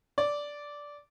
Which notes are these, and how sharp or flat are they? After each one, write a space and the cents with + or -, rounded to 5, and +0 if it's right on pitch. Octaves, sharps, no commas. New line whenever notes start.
D5 -10